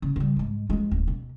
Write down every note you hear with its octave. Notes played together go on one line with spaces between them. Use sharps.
C#3
C#3 G3
G#2 G#3
F3 G#3
D1
B2